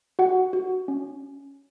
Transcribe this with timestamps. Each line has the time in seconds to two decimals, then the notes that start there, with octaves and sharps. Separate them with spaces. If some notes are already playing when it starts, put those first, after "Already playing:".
0.19 F#4 F#5
0.53 F#4
0.88 C#4